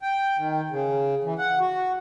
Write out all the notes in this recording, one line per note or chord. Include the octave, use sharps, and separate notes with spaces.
G5
D#3
C#3
E3
F#5
F#4